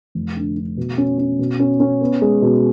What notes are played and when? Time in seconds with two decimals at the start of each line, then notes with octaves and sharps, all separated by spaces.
0.15 F1
0.37 D3
0.57 D3
0.77 B2
0.98 C#4
1.18 C#4
1.39 B2
1.59 C#4
1.80 C#4
2.01 B3
2.22 G#3
2.42 B2